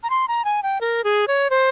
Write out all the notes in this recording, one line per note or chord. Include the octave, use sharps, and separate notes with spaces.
A#5
C6
A#5
G#5
G5
A#4
G#4
C#5
C5